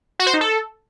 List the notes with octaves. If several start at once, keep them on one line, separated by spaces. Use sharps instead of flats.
F#4
C5
D#4
A4